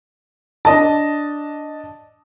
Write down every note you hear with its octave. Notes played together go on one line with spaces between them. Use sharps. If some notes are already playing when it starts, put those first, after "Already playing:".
D4 D#5 A5